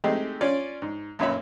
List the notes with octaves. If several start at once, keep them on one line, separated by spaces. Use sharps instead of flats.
G#3 A3 C4 D#4 G4 C5
C#4 F4 C#5 D5
G#2
B1 F#2 A#2 C#5 E5 B5